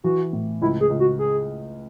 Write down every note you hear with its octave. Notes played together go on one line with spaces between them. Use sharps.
E3 F#4
A2
C#2 E4
G#4
C#2
F#4
G#4